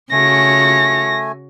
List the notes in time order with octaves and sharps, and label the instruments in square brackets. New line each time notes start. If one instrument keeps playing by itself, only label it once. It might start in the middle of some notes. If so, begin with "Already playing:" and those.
[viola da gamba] C#3 F#4 C#5 [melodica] A3 G#5 [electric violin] A#6